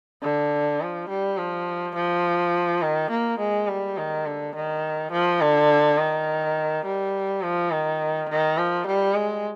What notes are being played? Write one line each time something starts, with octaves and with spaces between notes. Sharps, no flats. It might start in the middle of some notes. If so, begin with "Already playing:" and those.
D3
F3
G3
F3
F3
D#3
A#3
G#3
G3
D#3
D3
D#3
F3
D3
D#3
G3
F3
D#3
D#3
F3
G3
G#3